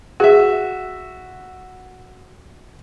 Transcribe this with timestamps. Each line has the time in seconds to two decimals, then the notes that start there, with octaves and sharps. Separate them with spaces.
0.20 F#4 G#4 E5